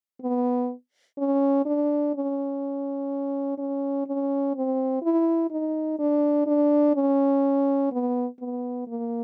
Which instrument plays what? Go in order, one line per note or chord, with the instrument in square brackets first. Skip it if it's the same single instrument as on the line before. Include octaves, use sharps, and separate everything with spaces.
[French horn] B3
C#4
D4
C#4
C#4
C#4
C4
E4
D#4
D4
D4
C#4
B3
B3
A#3